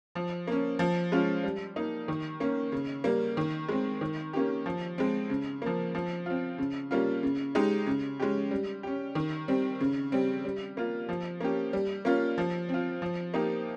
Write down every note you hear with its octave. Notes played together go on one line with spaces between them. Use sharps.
F3
A#3 C#4
F3
G#3 C#4 F4
G3
A#3 D#4
D#3
A#3 C#4
C#3
G3 A#3
D#3
G#3 C4
D#3
A#3 C#4 G4
F3
G#3 C4
C#3
F3 A#3
F3
C4 F4
C#3
G3 A#3 C#4 F4
C#3
G#3 D#4 G4
C#3
G#3 C#4 G4
G3
C#4 G4
D#3
G3 C4
C#3
G3 C4
G3
A#3 F4
F3
A#3 C#4 G4
G3
A#3 C#4 F4
F3
C4 F4
F3
A#3 D#4 G4